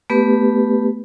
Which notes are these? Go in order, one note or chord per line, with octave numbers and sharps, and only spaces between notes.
A3 B3 G4 B4